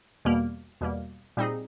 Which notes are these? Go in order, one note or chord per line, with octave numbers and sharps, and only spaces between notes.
E2 B2 G3 A#3
E2 B2 G3 A#3
A#2 G3 C4 D#4 G#4